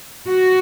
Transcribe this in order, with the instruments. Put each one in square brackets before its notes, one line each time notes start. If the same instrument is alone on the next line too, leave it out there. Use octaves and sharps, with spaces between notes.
[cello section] F#4